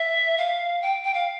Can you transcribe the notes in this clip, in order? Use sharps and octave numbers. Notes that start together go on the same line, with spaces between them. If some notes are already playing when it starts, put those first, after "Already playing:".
Already playing: E5
F5
G5
G5
F5